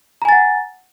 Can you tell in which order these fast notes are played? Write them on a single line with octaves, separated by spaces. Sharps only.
A#5 G#5 A6 F#5